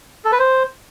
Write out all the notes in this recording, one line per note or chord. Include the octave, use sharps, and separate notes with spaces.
A4
B4
C5